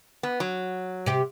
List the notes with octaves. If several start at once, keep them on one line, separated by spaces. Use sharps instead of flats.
B3
F#3
C3 G4